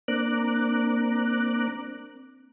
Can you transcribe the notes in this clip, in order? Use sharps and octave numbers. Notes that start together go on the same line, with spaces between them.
A#3 C4 D4 A#5 D6 F#6